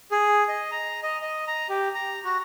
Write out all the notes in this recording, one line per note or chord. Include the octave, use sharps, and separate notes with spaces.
G#4
D#5
A#5
D#5
D#5
A#5
G4
A#5
F#4